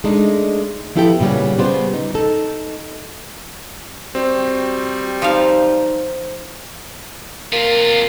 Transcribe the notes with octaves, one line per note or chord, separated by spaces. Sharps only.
G#3 A3 D4 D#4
F3 B3 E4 G4 A4 G5
A#2 C#3 G3 B3 C#4
C#3 G3 B3 F4 C5
D#4
D#4 A4
G3 C4 F#4
F3 D#4 F5
C3 A#3 F4